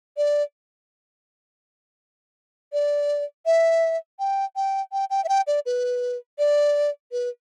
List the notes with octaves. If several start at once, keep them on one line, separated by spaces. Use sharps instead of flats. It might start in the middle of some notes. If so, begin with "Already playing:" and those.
D5
D5
E5
G5
G5
G5
G5
E5
G5
D5
B4
D5
B4